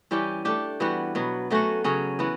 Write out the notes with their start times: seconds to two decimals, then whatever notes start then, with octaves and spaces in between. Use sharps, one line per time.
0.11 E3 G3 C#4 G4
0.45 A3 D4 G4
0.80 E3 G3 B3 F#4
1.15 B2 F#3 B3
1.50 F#3 A3 C#4 F#4
1.84 C#3 F#3 C#4
2.19 E3 B3 F#4